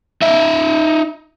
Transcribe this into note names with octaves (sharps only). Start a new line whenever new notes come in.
D#4 E5